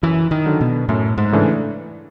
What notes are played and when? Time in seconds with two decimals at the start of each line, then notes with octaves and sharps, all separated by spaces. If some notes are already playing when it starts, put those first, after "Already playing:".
0.03 F#2 E3
0.31 D#3
0.46 D3 F#3
0.61 B2
0.89 F#2 A2
1.17 G#2
1.32 C#3 E3 A3 D4